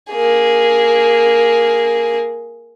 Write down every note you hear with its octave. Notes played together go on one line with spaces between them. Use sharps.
A#3 G#4